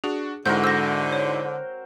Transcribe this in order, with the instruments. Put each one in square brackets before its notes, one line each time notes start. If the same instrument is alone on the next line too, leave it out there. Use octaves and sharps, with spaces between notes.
[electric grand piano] D4 F#4 [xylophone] G#4
[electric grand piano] G#2 G#3 E4 [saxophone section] D3 [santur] C4 F#4 A#4 [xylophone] G6
[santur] C5 [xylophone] E6 A#6
[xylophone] C#5